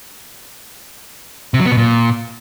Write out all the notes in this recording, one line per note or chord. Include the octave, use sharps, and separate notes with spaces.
C3
F#3
B3
B2
A#2